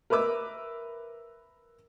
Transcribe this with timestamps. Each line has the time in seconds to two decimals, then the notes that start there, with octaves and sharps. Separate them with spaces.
0.10 A#4 B4 E5 D6 E6